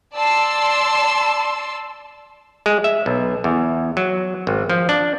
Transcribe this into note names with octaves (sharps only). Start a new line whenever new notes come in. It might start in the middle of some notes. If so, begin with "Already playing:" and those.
D5 A5 C6 E6
G#3
E5
B1
E2
F#3
G#1
F3
D4